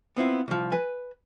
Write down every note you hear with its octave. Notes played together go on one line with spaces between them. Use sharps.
B3 C4 E4 F4
C2 F3
B4 G#5